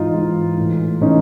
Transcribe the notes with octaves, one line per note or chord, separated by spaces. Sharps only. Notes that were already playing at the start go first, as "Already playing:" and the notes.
Already playing: G#2 E3 D#4 F4
G#2 E3
A2 E3
A2 E3 C#4 D#4